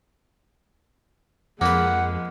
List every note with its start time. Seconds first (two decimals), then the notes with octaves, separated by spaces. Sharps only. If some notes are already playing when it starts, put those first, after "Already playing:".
1.61 F2 F3 G#3 A#3 B4 F#5